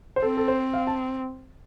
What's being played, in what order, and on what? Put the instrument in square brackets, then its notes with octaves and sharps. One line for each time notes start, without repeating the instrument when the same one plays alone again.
[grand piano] C5
[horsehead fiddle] C4 [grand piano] A4
[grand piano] A4
C5
F5
A5